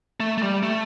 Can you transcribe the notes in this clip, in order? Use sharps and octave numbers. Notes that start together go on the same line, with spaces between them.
A3
A3
G3
A3